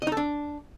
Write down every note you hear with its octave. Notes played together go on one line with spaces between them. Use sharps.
D#5
D#4
A4
D4